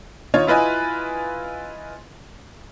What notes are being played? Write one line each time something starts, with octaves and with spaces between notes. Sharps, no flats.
D#3 D#4 F4 C#5
E4 F4 B4 D#5 G#5